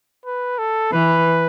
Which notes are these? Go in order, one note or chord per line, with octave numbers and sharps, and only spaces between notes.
B4
A4
E3 B4